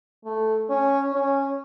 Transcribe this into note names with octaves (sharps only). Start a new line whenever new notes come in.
A3
C#4
C#4